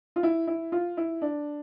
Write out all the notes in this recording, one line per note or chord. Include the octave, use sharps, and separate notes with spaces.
F4
E4
E4
F4
E4
D4